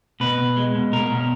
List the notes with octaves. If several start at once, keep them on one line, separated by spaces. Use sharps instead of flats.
B2 B4
B2
G#3
B2
B2 A#4
B2